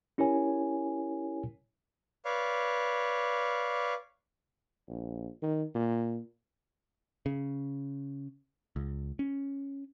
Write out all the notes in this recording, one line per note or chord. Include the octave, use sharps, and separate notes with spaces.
C#4 E4 G4 A#4 C#5 G#5
B4 C#5 D5 F5
A#1
D#3
A#2
C#3
C#2
C#4